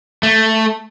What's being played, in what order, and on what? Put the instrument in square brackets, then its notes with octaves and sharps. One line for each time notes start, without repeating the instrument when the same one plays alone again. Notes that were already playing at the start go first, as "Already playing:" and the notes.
[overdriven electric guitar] A3